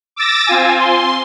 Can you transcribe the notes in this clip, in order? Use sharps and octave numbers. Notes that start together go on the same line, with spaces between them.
D6 E6 A6 A#6
C4 F4 G#5
C6